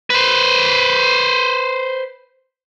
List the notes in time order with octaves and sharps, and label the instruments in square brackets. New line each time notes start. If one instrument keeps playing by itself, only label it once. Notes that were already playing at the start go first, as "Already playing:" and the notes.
[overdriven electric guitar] B4 C5